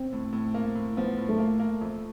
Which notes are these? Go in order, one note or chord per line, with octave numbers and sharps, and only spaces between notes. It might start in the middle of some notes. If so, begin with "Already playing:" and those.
Already playing: C4
A2
A2
A#3
A2
F3 B3
A2
A3
A#3
A#3
F2